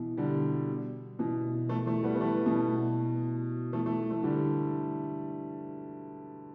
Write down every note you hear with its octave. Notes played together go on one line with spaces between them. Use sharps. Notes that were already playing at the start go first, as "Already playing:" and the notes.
Already playing: B2 E3
D3 G3
B2 E3
E3 A3
E3 A3
G3 B3
B3
E3 A3
B2 E3
E3 A3
E3 A3
E3 A3
D3 G3